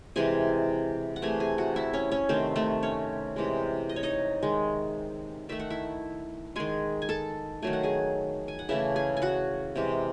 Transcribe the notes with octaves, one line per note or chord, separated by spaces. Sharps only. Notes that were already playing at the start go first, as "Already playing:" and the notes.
C3 E3 G#3 G#4 G#5
F#5
C3 E3 A3 G#4 G#5
G#4 G#5
F#4 F#5
E4 E5
C#4 C#5
C#4 C#5
C3 D#3 A3 C4 C5
A3 A4
C#4 C#5
C3 E3 G#3
D#5
C#5
D#4 D#5
D#3 G#3
D#3 A3 E5
F#5
E4 E5
D#3 G#3 G#4 G#5
G#5
A4 A5
D#3 F#3 A3 G#5
F#5
G#4 G#5
G#5
F#5
C#3 E3 A3 E4 E5
G#4 G#5
G#5
F#4 F#5
C3 E3 G#3